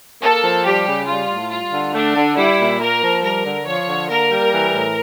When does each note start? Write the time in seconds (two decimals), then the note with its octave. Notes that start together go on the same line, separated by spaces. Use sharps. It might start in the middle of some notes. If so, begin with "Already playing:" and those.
0.23 A#3 A4
0.44 F3
0.65 G3 G4
0.87 C#3
1.08 G3 F4
1.30 A2
1.51 G3 F4
1.73 D3
1.94 A3 D4
2.16 D3
2.37 G3 E4
2.60 A#2
2.80 A#3 A#4
3.02 F3
3.23 G3 A#4
3.45 D3
3.67 F3 C#5
3.88 D3
4.09 A#3 A#4
4.31 G3
4.52 E3
4.74 A2